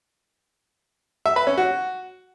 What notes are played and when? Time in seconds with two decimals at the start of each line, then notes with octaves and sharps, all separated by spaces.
1.26 E5
1.36 B4
1.47 C#4
1.57 F#4